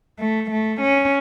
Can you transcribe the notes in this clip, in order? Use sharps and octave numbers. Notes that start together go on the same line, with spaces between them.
A3
A3
C#4